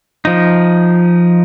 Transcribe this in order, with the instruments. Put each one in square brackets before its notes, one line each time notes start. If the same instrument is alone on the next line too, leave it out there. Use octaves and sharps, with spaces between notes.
[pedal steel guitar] F3 D#4